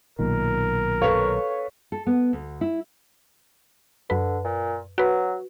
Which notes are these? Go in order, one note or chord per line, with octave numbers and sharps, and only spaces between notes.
B1 A#2 D#3 A#4
A4 B4 C#5 F5
A4
B3
D2
E4
F#2 D3 B4
A#2
F#3 F#4 B4